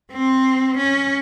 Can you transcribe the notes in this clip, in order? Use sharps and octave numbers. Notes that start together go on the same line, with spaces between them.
C4
C#4